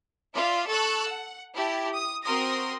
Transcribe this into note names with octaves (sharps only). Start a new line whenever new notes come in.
F4 D5 E5
A4 C#6 E6 F#6
F#5
E4 G4 A5
D#6
C4 F#4 A#4 C6 D#6 A#6